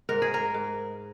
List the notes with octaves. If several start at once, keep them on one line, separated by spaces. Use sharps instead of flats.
G#2 A#4
G#4
A#4
G#2